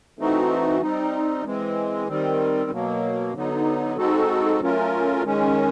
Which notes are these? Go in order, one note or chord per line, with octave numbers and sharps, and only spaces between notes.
E3 A3 C4 D#4 F#4
G3 C4 D#4
E3 G#3 C4
D#3 G3 C4
B2 F#3 A#3
D3 F#3 B3 D#4
G#3 C4 D#4 F#4 A4
F#3 A3 C#4 F4 A#4
D#3 G#3 C#4